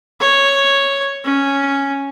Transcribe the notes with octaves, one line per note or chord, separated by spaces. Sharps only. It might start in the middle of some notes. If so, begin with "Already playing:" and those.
C#5
C#4